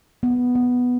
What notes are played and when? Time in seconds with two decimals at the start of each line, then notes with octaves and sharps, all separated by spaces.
0.23 B3
0.55 B3